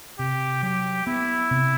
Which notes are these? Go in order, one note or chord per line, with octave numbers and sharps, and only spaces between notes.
C3 G4
F#3 G4
B3 E4
C3